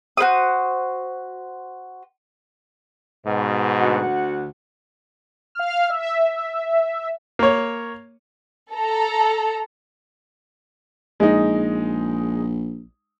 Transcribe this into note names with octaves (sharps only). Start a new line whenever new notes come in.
F#4 B4 C5 D#6
G#2 B2
D2 F#4 F#5
F5 F6
E5
A#3 C#5
A4 A#5
A#1 G#3 D#4